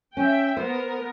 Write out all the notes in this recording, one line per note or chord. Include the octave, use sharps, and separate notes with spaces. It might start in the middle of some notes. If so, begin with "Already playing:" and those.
C#4 E5 G5
B3 A#4 C5